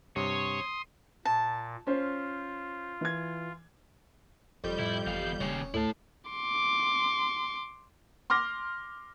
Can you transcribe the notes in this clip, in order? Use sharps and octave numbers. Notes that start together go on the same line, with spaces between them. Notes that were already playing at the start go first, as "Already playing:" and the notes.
G2 C3 C#5 C6 D#6
A#2 A5
C#4 F4 C5
E3 G#6
F#1 F2 G3 G6
A2 E4
G1 E2 F5
D#1 D#2 C#3 C#4
D2 A2 E4 A5
C6 D6
C6 D6 F6 A#6